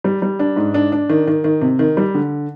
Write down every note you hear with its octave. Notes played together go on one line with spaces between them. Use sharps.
G3
G3
D4
G#2
D4
D4
D#3
D#3
D#3
C3
D#3
G3
D3